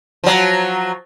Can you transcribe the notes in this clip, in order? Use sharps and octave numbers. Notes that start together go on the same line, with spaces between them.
F3 F#3